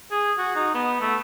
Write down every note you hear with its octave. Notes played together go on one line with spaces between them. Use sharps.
G#4
F#4
D#4
B3
A3